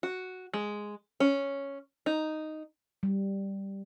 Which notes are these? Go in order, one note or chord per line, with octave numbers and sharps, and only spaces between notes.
F#4
G#3
C#4
D#4
G3